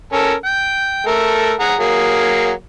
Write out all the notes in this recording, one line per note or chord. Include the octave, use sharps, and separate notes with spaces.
C#4 A4 A#4
G5
A3 A4 A#4
G#4 F#5 A#5
F#3 A#3 G#4